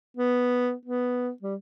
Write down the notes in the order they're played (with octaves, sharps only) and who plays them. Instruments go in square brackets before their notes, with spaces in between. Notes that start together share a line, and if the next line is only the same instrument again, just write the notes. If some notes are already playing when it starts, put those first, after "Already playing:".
[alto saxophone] B3
B3
G3